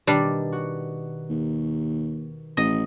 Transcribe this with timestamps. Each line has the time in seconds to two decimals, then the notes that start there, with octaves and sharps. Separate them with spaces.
0.07 B2 D#3 G3 D4
0.52 F#4 F#5
1.29 D#2
2.57 A1 D#5